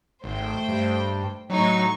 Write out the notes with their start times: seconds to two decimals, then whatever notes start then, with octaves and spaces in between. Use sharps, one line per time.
0.24 G#1 A3 C5 G5
0.68 G2
1.50 A2 F#3 D#4 C#6